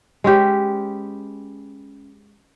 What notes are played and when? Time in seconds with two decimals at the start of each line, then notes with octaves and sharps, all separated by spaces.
0.24 G#3 C#4 G4 B4